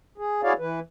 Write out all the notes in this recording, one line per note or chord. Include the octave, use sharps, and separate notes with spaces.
G#4
E4 F#4 G#4 C#5 D5 F5
E3 B4